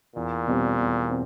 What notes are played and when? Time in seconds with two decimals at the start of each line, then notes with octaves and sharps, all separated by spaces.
0.16 E2 A#2
0.47 B2 G3 C4
0.79 E2
1.10 C4